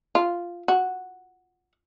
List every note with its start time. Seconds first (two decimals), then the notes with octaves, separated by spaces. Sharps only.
0.15 F4
0.68 F#4